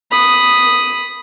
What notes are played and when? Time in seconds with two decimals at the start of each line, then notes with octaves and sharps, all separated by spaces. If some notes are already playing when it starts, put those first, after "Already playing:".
0.11 B5 D#6